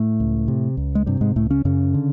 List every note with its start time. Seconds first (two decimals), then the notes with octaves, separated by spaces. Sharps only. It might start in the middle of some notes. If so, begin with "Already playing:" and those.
Already playing: A2 A3
0.20 C#2
0.48 C3
0.77 C#2
0.95 G#3
1.06 G2 C3 G3
1.21 G#2 G#3
1.36 C#2 A2 A3
1.50 C#3 C#4
1.65 F#2 C#3 C#4
1.94 D3